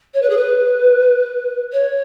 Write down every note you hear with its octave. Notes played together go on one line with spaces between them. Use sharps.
C#5
B4
G#4
B4
C#5